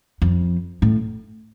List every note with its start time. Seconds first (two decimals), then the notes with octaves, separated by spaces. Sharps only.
0.22 F2
0.82 A2